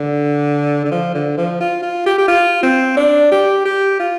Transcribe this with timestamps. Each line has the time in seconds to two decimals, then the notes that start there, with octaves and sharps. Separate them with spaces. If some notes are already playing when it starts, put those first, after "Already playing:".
Already playing: D3
0.85 D3
0.91 F3
1.15 D3
1.38 F3
1.61 F4
1.83 F4
2.06 G4
2.18 G4
2.28 F4
2.63 C4
2.97 D4
3.32 G4
3.66 G4
4.00 F4